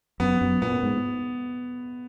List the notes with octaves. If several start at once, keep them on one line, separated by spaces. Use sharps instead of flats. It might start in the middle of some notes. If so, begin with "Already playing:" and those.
F#2 B3
F#2
A#2 B3
G#2